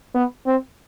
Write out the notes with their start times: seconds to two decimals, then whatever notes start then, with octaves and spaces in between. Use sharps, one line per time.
0.15 B3
0.46 C4